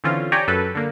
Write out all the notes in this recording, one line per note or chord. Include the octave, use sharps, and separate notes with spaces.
D3 E3 C4 C#4 F4
G4 C#5 D5 G5 G#5 A#5
F#2 A4 B4
D3 A#3